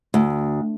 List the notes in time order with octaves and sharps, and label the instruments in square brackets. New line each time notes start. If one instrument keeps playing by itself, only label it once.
[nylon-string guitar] D2